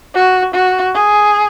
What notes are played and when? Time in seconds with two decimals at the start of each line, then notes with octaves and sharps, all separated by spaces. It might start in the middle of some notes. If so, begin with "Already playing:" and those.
0.14 F#4
0.54 F#4
0.95 G#4